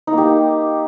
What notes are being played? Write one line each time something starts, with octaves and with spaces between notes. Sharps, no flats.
D#4
A#3
G4